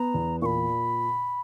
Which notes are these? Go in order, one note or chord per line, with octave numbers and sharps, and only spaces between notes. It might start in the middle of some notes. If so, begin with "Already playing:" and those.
Already playing: B3 A#5
E2
A#2 B5 C#6